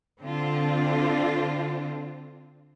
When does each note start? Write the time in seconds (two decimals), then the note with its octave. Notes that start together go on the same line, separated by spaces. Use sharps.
0.22 D3 C4 D4 F4